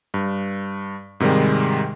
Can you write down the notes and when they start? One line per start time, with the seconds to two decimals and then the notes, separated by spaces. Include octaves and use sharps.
0.14 G2
1.20 G#2 C3 D#3 G3 G#3